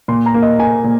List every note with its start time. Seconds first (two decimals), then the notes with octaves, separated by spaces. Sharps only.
0.08 A#2 C6
0.26 A#5
0.34 A#3
0.42 D#5
0.58 A#3 G#5
0.84 A#2